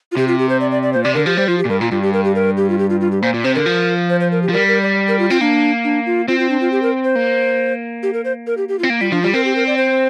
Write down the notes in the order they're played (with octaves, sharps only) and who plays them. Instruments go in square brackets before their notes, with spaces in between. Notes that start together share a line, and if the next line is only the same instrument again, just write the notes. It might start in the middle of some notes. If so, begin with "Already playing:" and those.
[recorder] F4
[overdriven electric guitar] C3 [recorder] G4
[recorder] F4
G4
C5
D5
D5
D5
[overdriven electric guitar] A#2 [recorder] C5
[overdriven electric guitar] C3 [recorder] D5
[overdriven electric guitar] D3 [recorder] A#4
[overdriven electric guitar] F3 [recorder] G4
[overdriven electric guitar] G3 [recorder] C5
[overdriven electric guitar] F3 [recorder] F4
[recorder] G4
[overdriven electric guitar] A#2
[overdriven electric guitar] G2 [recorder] A#4
[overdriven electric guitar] A#2 [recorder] F4
[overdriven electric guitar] G2 [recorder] F4
[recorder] G4
A#4
G4
A#4
G4
F4
G4
F4
F4
G4
[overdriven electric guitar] A#2 [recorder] C5
[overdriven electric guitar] A#2
[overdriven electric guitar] C3 [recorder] C5
[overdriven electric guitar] D3 [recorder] A#4
[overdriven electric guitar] F3
[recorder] C5
C5
A#4
G4
[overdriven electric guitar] F3
[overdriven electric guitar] G3 [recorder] A#4
[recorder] A#4
D5
A#4
F4
[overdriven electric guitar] C4 [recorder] F4
[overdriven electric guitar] A#3 [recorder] D4
[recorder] D4
F4
[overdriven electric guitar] C4 [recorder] F4
[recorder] F4
D4
F4
G4
A#4
C5
[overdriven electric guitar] A#3
[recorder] G4
A#4
C5
A#4
G4
G4
F4
[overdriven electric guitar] C4
A#3
[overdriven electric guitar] G3 [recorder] F4
[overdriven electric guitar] F3 [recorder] D4
[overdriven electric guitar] G3 [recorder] F4
[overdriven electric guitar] C4 [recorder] A#4
[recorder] G4
A#4
D5
C5